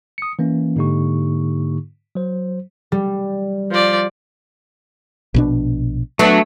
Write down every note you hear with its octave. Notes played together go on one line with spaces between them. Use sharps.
D#6 C#7
E3 A#3 C#4
G#2 D3 A#3 D#4 G4 C#6
F#3 C5
G3
F3 D5
A#1 B2 D4
F#3 A3 B3 D4